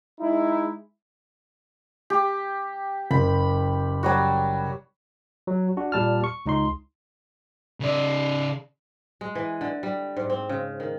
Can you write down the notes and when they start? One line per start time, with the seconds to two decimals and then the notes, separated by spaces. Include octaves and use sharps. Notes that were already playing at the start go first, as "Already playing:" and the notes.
0.20 G#3 D#4 E4
2.10 G4
3.11 F#1 B5
4.03 F#3 G3 F#4
5.47 F#3
5.77 D4 F#4
5.92 A#2 G3 A5 F6
6.24 C#6
6.46 C#2 D#4 C6
7.80 C#3 D5
9.21 G#3
9.35 E3
9.61 D3
9.83 G3
10.16 G#2
10.30 C4
10.49 C#3
10.80 D#3